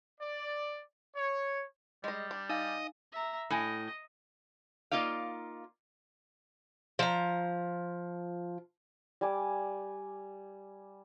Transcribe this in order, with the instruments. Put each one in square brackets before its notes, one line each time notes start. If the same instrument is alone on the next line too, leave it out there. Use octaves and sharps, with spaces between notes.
[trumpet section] D5
C#5
[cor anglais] G3 [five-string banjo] G#3 D#5
[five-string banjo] D4
[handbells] D#4 F5 [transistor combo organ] D#5
[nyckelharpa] E5 A#5
[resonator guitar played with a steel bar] A2 G#5 [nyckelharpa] D#5
[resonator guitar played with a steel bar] A#3 D#4 F4 D5 F5
[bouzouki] F3 A#5
[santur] G3 G#5 D6